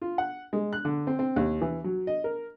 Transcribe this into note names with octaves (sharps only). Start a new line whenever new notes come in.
F4
F#5
G#3
F#6
D3
C4
C4
D#2
E3
F#3
D#5
A#4